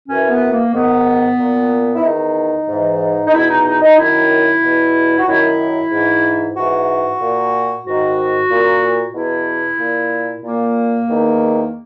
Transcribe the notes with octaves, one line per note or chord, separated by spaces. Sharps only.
F#2 E3 C#4
B3
A#3
G#2 D#3 B3
A#2
E4
E2 D#3 D#4
G#2 E3
D#4
E2 B2 E4
D#4
D#4
D#4
F#2 D#3 E4
E2 B2
F#4
F#2 D#3 E4
G#2 E3
G#2 E3 F#4
A#2
G#2 D#3 F#4
A#2
E2 B2 E4
A#2
A#2 A#3
E2 D#3